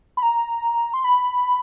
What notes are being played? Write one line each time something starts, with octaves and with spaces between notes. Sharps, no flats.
B5
A#5
C6
B5